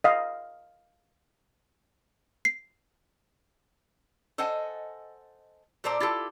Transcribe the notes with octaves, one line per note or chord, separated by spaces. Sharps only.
D#5 F5
C7
A4 C5 D#5 F#5 G#5
A#2 A4 C5 D5 A#5
E4 F4 G4 A4